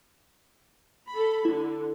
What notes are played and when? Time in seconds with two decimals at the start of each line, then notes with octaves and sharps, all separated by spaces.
1.12 A4 B5
1.45 D3 E4